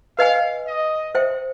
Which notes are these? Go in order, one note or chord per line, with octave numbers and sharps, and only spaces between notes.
B4 D#5 F5 G#5
D#5
C5 E5 G5